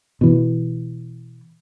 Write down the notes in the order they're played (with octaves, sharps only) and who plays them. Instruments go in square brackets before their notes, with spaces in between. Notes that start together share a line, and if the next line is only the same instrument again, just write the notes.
[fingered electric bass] B2 E3